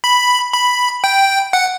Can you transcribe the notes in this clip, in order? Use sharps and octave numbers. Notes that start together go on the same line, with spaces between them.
B5
B5
G5
F#5